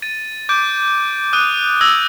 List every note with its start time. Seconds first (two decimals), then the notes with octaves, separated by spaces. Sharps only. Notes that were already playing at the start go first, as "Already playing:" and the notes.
0.02 A6 D#7
0.49 D6 G6 D7
1.33 D#6 F#6 D#7
1.81 E6 G#6 A#6 F#7